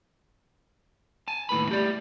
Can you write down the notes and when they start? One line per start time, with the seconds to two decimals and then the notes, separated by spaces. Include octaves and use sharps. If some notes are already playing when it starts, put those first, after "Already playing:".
1.28 G#5 A5
1.49 D#2 A2 B4 B5
1.69 A3 G4 D5